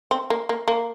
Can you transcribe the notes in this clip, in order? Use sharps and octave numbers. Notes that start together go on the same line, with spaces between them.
C4
A#3
A#3
A#3